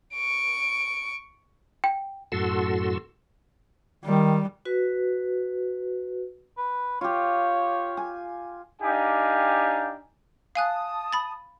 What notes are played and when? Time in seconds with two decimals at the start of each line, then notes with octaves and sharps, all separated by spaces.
0.14 C#6 D7
1.84 G5
2.32 F#2 A2 F#4 A4 C6 E6
4.05 D#3 G3
4.65 F#4 B4
6.58 B4
7.01 F4 G4 C#5
7.97 G#5
8.81 D4 D#4 G4 F5 G5 G#5
10.55 F5 G#5 A5 D#6 F#6
11.13 B5 A6